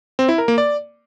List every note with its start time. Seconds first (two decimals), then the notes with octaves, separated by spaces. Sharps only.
0.19 C4
0.29 E4
0.38 A#4
0.48 A#3
0.58 D5